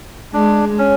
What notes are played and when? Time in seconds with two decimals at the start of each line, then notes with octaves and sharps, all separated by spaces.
0.33 G#3 D4
0.78 C#4